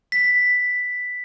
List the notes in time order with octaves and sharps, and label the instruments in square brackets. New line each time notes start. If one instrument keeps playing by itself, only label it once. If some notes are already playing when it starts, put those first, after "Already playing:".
[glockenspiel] B6